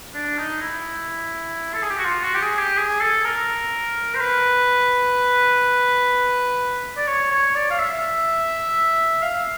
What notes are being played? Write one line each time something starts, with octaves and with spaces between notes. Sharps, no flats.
D4
D#4
E4
A4
G#4
G4
F#4
F4
F#4
G4
G#4
G4
G#4
A4
A#4
C5
B4
D5
C#5
C#5
D5
F5
E5
F5